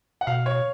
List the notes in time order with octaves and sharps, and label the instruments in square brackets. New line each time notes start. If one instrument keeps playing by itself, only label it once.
[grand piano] F#5
[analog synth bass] B2 [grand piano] F5
[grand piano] C#5